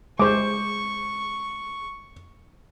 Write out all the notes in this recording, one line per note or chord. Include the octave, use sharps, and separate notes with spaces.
G#3 C5 C#6 D6